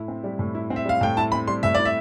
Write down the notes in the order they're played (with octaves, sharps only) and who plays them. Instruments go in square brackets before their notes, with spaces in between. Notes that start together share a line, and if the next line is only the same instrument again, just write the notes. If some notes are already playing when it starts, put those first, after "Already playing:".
Already playing: [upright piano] A2 E4
C4
G3
A2
E4
C4
[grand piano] E5
[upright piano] G3 [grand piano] F5
[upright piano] A2 [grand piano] G5
[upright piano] E4 [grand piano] A5
[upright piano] C4 [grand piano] B5
[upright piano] G3 [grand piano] C6
[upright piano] A2 [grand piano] E5
[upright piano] E4 [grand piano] D5
[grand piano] E5